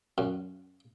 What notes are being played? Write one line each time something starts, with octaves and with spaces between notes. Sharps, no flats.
F#2